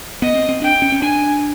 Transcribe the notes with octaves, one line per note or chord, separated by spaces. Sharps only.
B3 D#5
C4
C4
D4 G5
C#4
C#4
D4 G#5